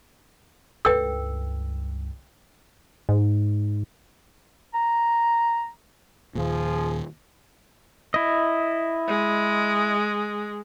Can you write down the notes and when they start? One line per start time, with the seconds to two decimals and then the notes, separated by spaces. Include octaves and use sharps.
0.85 C#2 G2 A4 B4 G5 E6
3.09 G#2
4.74 A#5
6.35 D#2 A#2 F3 G#4
8.14 E4 D#5
9.08 G#3